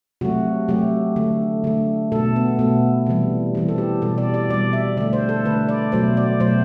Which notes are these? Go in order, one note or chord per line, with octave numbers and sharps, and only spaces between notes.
C3 F#3 A3 F#4
C3 F#3 A3 G4
D3 A3
D3 A3
B2 A3 A4
B3
B2 A3 B3
C3 E3 G3
C3 E3 G3 C4
A4
G4
B2 G3 A4
D5
D5
B2 G3 D5
E5
D3 A3 D5
C5
A4
D3 A3 B4
D5
B2 F#3 A3 C5
D5
B2 F#3 A3 C5